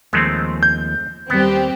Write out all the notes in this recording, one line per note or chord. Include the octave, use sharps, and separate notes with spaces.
D#2 F3 G#3 A3 C4
G6
D#2 G3 B3 C4 G4